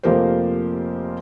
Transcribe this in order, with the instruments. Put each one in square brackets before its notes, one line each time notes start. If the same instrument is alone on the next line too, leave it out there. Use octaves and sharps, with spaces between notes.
[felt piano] F1 F3 A#3 G4 A#4 C5